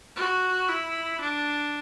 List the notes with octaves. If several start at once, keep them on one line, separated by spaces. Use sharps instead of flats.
F#4
E4
D4